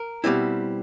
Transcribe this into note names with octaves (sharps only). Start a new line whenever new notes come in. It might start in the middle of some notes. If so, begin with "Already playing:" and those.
Already playing: A#4
B2 G3 C4 E4